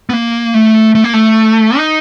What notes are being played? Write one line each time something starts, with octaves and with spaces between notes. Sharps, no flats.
B3
A#3
A3
A3
A#3
A3
D#4